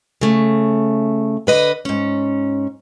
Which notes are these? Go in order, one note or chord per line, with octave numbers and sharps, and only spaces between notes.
C#3 A3
D3 B4 D#5
G#2 C#4